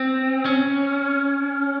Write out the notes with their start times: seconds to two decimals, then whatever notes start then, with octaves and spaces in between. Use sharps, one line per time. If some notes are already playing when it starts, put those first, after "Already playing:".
Already playing: C4
0.45 C#4